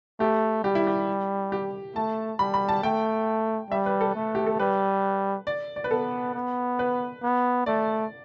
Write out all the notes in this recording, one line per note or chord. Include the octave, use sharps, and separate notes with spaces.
A3 G4
G3 G4
E4
G4
G4
A3 A5
G3 B5
B5
A5
A3 G5
G3 E5
B4
A4
A3
G4
A4
G3 B4
D5
D5
B4
B3 A4
B3
B4
B3
A3 D5